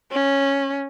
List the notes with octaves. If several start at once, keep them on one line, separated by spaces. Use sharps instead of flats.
C#4